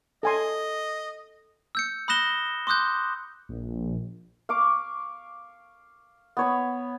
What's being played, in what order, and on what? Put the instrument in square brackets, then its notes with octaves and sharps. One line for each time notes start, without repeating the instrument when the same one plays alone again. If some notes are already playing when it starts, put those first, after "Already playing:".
[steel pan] A4 G#5 C6 [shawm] D#5
[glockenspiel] E6 G6 C#7
B5 D#6 F#6 A#6 E7 G7
C6 D6 D#6 F#6 G6
[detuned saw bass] A#1
[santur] F5 C#6 D6
B3 C#5 B5